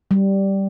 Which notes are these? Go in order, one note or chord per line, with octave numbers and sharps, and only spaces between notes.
G3